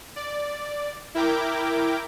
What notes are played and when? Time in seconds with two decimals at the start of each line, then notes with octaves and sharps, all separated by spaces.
0.16 D5
1.15 E4 A#4 G5 D6